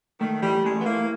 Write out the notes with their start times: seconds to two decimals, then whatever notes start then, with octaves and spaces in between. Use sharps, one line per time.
0.20 D#3 A3
0.42 E3 G3
0.64 G#3 A3
0.79 B3
0.85 A#3 E4